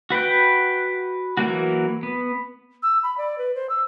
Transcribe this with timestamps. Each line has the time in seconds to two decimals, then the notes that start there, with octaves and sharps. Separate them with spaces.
0.10 F#4 B4 F#5 G5
1.37 E3 F#3 A#3 F#4
2.03 B3
2.83 E6
3.03 B5
3.18 D5
3.38 B4
3.55 C5
3.69 E6